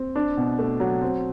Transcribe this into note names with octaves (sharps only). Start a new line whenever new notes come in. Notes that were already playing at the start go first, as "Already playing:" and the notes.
Already playing: C4
D4
B2
A3
F#3
C4